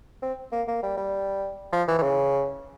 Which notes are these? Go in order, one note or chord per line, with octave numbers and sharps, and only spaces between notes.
C4
A#3
A#3
G3
G3
F3
E3
E3
C#3